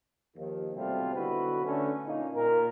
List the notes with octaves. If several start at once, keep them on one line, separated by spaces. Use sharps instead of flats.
D#2 D#3 F3
B1 C3 G3 A3 C4 F4
B1 B2 D3 E4 F#4 B4
D3 A3 C#4
A#2 A#3 C#4 D#4
A#2 A#4